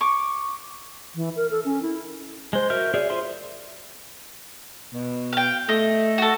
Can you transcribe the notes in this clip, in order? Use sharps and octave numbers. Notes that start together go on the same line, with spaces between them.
C#6 D6
E3
A#4
A4
C#4
E4
G#3 C5
F#4 A#4 E5 F6 G6
G#4 C#5 D5 E5
F4 G#4 C5 E5 C6
B2
F5 G5
A3 D#5
F#4 A4